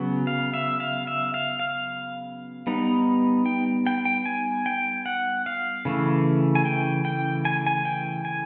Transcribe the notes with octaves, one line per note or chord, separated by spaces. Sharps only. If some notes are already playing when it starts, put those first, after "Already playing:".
Already playing: C#3 F#3 B3
F5
E5
F5
E5
F5
F5
G3 B3 D#4
G5
G5
G5
G#5
G5
F#5
F5
C#3 E3 A3
G#5
G5
G5
G#5
G#5
G5
G#5